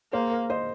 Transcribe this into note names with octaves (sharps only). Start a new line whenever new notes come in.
A#3 G#4 C5
A#4
C5 D#5